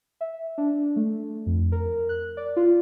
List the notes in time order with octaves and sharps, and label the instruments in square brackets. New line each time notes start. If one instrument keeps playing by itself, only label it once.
[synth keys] E5
D4
A3
F2
A#4
F#6
D5
F4